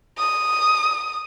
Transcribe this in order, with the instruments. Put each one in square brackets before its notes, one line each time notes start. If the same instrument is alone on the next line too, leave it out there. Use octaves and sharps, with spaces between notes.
[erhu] D#6